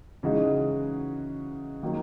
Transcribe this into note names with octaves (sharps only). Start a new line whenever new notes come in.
C#3 E3 G#3 D#4 F#4
D#3 F#3 A#3